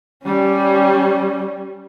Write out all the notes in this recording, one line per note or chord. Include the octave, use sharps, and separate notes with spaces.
G3 C#4